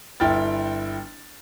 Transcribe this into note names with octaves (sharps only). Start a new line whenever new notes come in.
G1 E4 G5 F6 A6